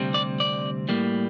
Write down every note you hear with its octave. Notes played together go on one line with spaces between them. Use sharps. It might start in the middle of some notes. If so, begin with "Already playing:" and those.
Already playing: D2 C3 G3 C4
D5
D5
A2 G3 A#3